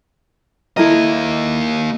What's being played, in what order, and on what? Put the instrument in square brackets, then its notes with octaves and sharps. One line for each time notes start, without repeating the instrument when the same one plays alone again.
[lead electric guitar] A#3 D#5 [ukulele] E4 A4 A#4